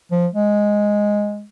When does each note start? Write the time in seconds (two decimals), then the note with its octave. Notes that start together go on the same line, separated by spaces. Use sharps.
0.11 F3
0.34 G#3